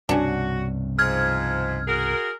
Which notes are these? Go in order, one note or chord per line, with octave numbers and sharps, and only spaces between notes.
C2 G2 B2 C#4 D4 F#4
G#2 F3 F6 G#6
F#4 G#4 A#4